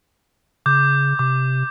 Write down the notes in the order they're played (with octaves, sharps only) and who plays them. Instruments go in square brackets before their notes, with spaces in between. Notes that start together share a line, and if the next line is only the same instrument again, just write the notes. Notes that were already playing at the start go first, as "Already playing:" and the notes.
[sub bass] C#3 [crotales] D6 G6
[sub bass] C3 [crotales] D6